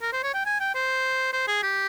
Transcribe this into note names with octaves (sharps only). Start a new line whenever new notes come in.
A#4
C5
C#5
G5
G#5
G5
C5
C5
G#4
G4